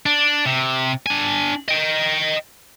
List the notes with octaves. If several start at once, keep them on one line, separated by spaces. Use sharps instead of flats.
D4
C3
D4 G#5
D#5 G5